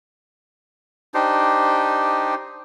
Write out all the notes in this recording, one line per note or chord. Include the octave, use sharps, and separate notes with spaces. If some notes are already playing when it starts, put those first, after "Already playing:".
D4 D#4 G4 C5